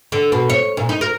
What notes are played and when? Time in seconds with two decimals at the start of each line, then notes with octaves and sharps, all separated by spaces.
0.12 D3
0.32 B2
0.50 C#5
0.77 A#2
0.89 D#4
1.01 A#4